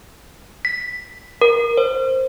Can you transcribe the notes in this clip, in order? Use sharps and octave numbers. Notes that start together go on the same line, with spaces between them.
B6
A#4
C5